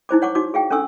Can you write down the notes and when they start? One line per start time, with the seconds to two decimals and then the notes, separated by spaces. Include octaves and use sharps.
0.09 D#4 E4 C5 D6
0.22 C#5 F#5 C#6 D6
0.35 D#4 F#4 D6
0.54 G#4 F5 G5
0.70 C#4 D4 A4 C#6 E6